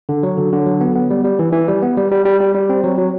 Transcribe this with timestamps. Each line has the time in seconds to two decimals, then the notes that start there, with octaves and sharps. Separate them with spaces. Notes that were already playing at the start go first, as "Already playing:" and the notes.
0.09 D3
0.23 F#3
0.38 D3
0.52 D3
0.67 F#3
0.81 B3
0.95 B3
1.10 G3
1.24 G3
1.39 E3
1.53 E3
1.68 G3
1.82 B3
1.97 G3
2.12 G3
2.25 G3
2.40 G3
2.55 G3
2.69 C4
2.84 F#3
2.98 F#3